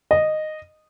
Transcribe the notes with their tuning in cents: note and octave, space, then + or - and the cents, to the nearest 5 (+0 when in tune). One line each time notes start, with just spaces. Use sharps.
D#5 -10